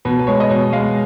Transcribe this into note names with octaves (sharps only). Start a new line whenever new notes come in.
B2 B4
B4
G#3 C#5
D#5
B2 C#5
G#3 F5